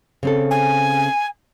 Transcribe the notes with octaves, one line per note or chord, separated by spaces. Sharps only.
C#3 C4 A4
G#5